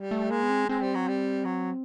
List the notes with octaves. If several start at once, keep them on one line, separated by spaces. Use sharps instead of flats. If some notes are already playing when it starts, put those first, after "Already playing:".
Already playing: G3
A3
G#3 A#3
B3
C4
G#3 C4
G3
F#3
G3
F#3